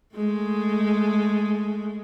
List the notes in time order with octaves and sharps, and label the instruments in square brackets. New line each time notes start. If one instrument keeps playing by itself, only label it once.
[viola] G#3 A3